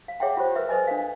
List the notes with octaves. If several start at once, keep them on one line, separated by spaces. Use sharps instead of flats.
F5
G#4 C#5 E5 F#5 G5
F4 G4 C5
A#4 B4 E5
A4 B4 C5 D#5 G#5
D4 F5